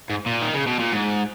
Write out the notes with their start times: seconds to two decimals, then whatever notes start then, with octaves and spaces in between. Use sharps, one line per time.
0.10 G#2
0.26 A#2
0.42 D#3
0.54 C#3
0.67 B2
0.80 A#2
0.92 G#2